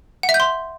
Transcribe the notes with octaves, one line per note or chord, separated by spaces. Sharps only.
F#5
E5
G6
C6